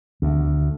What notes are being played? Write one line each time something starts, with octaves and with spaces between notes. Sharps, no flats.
D2